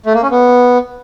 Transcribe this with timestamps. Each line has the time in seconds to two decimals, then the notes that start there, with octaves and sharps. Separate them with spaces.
0.06 A3
0.14 A#3
0.22 C#4
0.31 B3